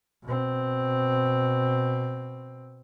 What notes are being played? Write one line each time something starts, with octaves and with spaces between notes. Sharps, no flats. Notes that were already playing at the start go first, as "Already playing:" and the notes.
B2 C4